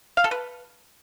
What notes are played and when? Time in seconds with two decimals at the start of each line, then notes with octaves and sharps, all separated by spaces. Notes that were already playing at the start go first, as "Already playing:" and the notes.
0.17 F5
0.24 A4
0.31 B4